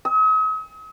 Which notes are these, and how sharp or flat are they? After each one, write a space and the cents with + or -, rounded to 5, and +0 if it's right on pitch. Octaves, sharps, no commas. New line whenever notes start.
D#6 +45